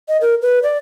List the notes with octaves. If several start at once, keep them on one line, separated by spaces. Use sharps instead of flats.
D#5
A#4
B4
D5